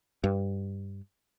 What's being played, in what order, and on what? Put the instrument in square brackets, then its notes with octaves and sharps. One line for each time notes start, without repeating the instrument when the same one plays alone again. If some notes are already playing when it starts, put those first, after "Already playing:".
[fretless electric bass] G2